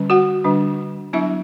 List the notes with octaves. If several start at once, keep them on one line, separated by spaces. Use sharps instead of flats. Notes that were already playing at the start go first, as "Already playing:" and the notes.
Already playing: D3 G3 C#4
F#4 F#5
D3 G3 D4
F#3 B3 D4 E4 E5